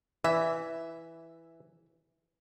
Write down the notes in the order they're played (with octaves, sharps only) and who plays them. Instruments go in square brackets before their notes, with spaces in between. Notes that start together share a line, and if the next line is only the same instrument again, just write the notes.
[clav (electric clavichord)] E3 [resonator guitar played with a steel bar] E5